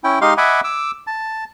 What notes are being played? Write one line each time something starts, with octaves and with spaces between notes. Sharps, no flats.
C#4 E4 G5
G#3 D#4 G4 F5 C6
D#5 E5 F#5 G#5 B5 D6
D6 E6
A5